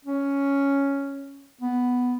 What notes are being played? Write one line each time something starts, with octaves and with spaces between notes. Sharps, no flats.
C#4
B3